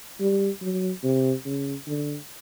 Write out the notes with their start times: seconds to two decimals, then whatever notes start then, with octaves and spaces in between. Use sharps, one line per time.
0.20 G3
0.62 F#3
1.03 C3
1.45 C#3
1.87 D3